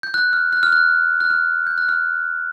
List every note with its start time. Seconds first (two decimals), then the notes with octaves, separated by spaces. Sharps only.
0.03 G6
0.14 F#6
0.33 F6
0.53 F#6
0.63 F6
0.72 F#6
1.21 F#6
1.30 F6
1.67 G6
1.78 F#6
1.89 F6